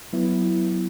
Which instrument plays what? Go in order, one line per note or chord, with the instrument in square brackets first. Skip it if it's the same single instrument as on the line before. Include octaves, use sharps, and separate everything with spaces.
[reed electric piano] F#3 B3 E4